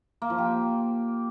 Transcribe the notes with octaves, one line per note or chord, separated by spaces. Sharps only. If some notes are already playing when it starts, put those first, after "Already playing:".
A#3
F3
G4